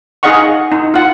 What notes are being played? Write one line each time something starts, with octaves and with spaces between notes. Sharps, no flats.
D#4 G#4 D#5 F5 F#5 C#6
D#4
F4 F#5